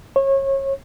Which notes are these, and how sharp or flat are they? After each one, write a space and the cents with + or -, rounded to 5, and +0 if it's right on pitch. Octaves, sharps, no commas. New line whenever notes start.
C#5 -30